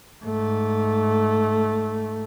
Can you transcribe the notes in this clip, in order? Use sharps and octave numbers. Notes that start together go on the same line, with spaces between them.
G#2 A3